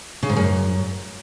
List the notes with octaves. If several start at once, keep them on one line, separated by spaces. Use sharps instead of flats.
C#3
G#2
F#2